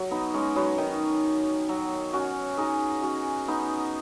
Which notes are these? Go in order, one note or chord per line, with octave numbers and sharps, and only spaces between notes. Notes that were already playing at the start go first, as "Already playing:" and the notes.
Already playing: F#3
B3 D#4
G#3 C#4
F#3 B3
D#3
F#3
C#4 F#4
D#4 G#4
C#4 F#4
B3 D#4